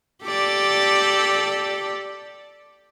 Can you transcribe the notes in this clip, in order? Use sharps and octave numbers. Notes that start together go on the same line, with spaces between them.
G4 A4 D5